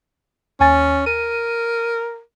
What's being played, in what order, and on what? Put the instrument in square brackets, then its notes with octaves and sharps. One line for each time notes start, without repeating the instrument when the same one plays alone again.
[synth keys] D#2 G#5 A6 [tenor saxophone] C#4
[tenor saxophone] A#4 [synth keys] D#7